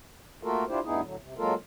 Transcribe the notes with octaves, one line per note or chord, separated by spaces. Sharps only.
A3 A#3 F4 F#4 A4 A#4
D4 E4 F4 G4 C5
D2 G2 B3 D#4 E4 G#4
A2 D3 F#3
C3
F#3 G#3 A#3 F4 A4 A#4